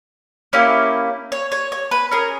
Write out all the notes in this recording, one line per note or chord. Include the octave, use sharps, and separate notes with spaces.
A#3 C#4 E4 G4
C#5
C#5
C#5
B4
C#4 G#4 A#4